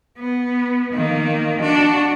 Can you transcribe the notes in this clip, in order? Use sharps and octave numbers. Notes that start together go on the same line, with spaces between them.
B3
D#3 A#3
D4 F#4